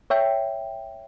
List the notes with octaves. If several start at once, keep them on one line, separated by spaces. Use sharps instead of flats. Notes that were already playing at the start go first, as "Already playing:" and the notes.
C#5 E5 G5